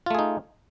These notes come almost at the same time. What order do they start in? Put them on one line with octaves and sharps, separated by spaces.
F4 A3 G#4 D#4